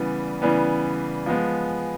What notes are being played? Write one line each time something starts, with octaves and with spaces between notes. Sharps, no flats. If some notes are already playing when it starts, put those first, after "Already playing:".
Already playing: C#3 E3 G3 B3
C#3 E3 G3 B3
F3 G#3 B3